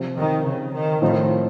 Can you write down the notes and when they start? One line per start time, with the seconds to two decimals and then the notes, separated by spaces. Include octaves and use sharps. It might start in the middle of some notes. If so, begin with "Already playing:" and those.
Already playing: C3 F3 C4
0.17 D#3
0.45 C#3
0.74 D#3
1.02 A2 D#3 F3 C4 F4